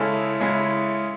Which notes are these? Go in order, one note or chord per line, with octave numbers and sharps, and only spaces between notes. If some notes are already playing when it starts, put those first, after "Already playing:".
Already playing: C#3 G#3 C#4 E4 A4
C#3 G#3 C#4 E4